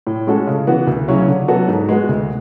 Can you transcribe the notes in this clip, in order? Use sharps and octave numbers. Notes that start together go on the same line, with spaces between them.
A2
G#3 C#4 F#4 A4
C#3
E3 B3 F#4
D2
C#3 F#3 C#4 E4
D3
F#3 B3 F#4 A4
G#2
G#3 B3 F#4
D2